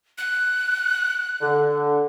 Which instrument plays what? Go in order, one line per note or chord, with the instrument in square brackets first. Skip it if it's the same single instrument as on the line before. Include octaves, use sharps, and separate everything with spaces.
[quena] F#6
[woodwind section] D3